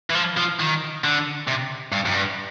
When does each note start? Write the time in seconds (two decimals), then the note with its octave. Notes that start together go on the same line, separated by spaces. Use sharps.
0.10 E3
0.15 F3
0.37 F3
0.60 D#3
1.04 D3
1.48 C3
1.92 G2
2.06 F#2
2.14 G2